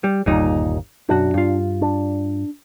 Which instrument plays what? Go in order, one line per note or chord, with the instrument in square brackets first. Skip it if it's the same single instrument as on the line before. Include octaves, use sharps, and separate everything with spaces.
[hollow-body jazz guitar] G3
[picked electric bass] G1 D#2 [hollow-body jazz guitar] A#2 G3 D#4
[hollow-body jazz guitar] B1 F#2 F#4 [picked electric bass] D4
[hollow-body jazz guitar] G2 F4
[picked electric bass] D4